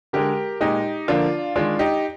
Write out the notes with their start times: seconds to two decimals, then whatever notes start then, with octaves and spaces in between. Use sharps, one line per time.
0.13 D3 G#3 G4 A#4
0.61 A#2 G#3 D#4 G4
1.08 D3 F3 A#3 D4 F4
1.56 D#3 G#3 D4 F4
1.79 D#4 G4